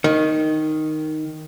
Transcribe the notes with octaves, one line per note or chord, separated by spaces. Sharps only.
D#3